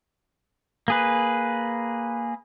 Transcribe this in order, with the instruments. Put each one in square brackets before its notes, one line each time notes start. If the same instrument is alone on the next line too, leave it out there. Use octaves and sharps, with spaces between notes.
[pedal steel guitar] A#3 G#4 B4